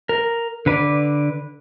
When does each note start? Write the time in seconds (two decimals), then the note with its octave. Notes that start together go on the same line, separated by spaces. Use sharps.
0.09 A#4
0.66 D3 B4 D5